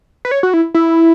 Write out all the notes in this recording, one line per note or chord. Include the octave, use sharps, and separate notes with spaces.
B4
C#5
F#4
E4
E4